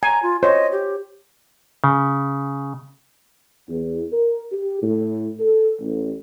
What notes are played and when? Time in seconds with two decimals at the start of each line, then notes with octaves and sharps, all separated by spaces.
0.03 G#5 A#5
0.23 F4
0.43 C5 C#5 D#5
0.72 G4
1.84 C#3
3.68 E2
4.11 A#4
4.52 G4
4.82 A2
5.39 A4
5.79 A1